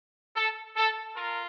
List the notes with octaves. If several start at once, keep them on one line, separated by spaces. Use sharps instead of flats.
A4
A4
F4 A#4